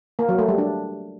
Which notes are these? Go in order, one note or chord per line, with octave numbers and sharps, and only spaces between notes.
A#3
F#3
A3
G3
D4